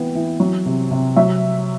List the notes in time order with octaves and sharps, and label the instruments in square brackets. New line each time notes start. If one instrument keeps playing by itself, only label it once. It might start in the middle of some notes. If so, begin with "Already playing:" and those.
Already playing: [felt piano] E3 B3 G5
E3
F#3
C3
C3
F#3 E5